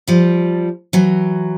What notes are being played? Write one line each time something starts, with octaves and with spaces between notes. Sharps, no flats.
F3 G3
E3 F#3